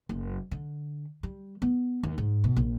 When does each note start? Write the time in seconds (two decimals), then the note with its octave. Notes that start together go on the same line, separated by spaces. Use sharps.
0.09 F#1
0.51 D3
1.23 G3
1.62 B3
2.03 D#2
2.18 G#2
2.44 B2
2.56 A#1